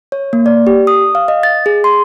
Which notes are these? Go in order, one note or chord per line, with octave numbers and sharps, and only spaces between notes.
C#5
A#3
D5
G4
D#6
F5
D#5
A6
G#4
C6